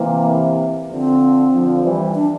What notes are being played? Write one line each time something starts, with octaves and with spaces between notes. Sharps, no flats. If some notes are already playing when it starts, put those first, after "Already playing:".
Already playing: C3 E3 A#3
D3 F3 C4
D3 F3
E3 G3
D4